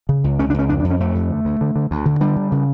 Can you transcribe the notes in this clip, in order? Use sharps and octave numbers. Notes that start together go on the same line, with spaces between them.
C#3
C#2
C#2 C#4
D4
C#2 C#4
F2 D4
D4
F2
C#4
F2 A3
F2
D3
D2
D3
D3
D2
D3
D3 G3
D3
C#3